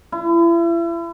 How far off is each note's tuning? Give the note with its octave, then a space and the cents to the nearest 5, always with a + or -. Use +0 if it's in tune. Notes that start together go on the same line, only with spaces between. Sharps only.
E4 +35